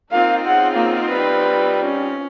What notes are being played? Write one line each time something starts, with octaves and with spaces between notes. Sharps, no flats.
A#3 C4 D#4 F4 F5
C#3 F#5
A#3
G3 B4
C#4